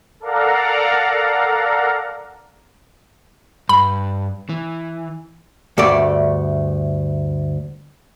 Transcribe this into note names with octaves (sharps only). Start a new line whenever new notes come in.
A4 A#4 D5 F5 F#5 A#5
G2 B5
E3
D2 G2 A3 D5